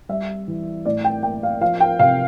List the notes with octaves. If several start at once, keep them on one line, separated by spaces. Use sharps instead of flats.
G3 E5
E3
A2 D5
G5
A#3 G5
F5
F3 F5
G5
C3 F5